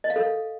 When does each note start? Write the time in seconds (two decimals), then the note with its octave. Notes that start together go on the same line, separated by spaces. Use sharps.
0.04 D#5
0.10 F5
0.16 A4